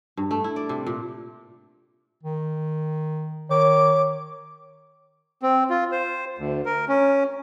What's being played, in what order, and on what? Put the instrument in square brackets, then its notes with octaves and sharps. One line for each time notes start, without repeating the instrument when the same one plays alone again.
[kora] G2
A3
E4
D5
C3
A#2
[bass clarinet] D#3
[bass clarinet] D#3 [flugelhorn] C#5 [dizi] D6
[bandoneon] C4
F4
C5
D2
A#4
C#4